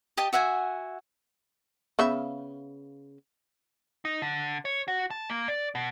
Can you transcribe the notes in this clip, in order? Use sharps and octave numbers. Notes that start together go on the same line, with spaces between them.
G4 D#5 G5 A5
F#4 E5 F#5 G#5
C#3 B3 E5
D#4
D3
C#5
F#4
A5
A#3
D5
B2